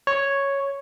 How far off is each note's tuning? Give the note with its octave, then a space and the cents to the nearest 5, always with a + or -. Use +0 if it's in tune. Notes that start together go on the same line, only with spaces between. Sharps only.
C#5 +0